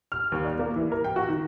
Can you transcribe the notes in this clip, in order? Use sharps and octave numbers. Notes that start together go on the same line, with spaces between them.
F6
D#2
D5
A#3
E3
A#4
G5
F#4
D#3